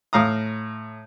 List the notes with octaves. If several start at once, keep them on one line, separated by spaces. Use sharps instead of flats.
A2 F5 A#5 D#6